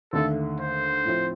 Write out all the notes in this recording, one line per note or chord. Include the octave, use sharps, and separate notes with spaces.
D#2 D3 A3 A4
C5
A2 F3 C4